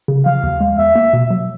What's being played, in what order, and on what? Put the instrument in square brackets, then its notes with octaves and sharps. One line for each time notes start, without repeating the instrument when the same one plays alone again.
[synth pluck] C#3
[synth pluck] F3 [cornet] F5
[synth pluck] D#2
G#3
[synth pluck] E2 [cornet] E5
[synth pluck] A#3
B2
F#3